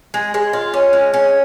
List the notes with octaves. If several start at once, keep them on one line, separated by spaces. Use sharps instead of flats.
G#3
G#3
F4
C#4
G#3
C#4